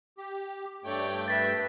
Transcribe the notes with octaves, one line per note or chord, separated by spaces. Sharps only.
G4
G2 A3 C#5 D5 G5
B4 E5 A6 B6